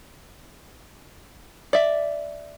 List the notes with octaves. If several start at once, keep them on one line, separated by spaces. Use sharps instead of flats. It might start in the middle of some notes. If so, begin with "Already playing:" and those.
D5 E5